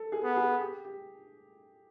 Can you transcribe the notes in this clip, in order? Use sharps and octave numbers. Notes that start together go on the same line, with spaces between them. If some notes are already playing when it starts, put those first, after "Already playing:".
Already playing: A4
G#4
B3
G#4
G4
G4